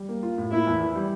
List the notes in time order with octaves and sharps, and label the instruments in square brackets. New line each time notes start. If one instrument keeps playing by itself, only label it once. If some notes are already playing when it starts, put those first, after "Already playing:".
Already playing: [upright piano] G3
A#3
F4
A2
[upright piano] A#3 [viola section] E4
[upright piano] E2
E3
G3